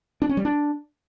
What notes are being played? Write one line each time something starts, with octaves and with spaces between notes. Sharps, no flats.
D4
C#4
G3
D4